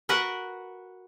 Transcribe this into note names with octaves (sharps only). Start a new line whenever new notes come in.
F#4 A#4 B4 F#5